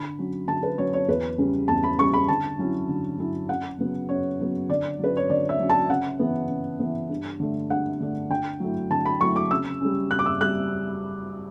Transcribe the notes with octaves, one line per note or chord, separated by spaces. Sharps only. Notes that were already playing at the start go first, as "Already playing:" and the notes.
Already playing: D3 B5
F#3 C#4
D3 A5
B4
F#3 C#4 C#5
C#5
E2 B4
C#3 G3 C#4
E2 A5
B5
C#3 G3 C#4 C#6
B5
D3 A5
F#3 C#4 E4
D3
F#3 C#4 E4
F#2 F#5
C#3 F#3 B3
F#2 C#5
C#3 F#3 B3
D3 D5
F#3 C#4 B4
C#5
D3 D5
E5
F#3 C#4
A5
C#3 F#5
E3 B3
C#3
E3 B3
G2
D3 A3 D4
G2 F#5
D3 A3 D4
D3 G5
F#3 A3 E4
D3 A5
B5
F#3 A3 E4 C#6
D6
C#3 E6
G3 C#4
C#3 F#6
D6
E6
G3 F#6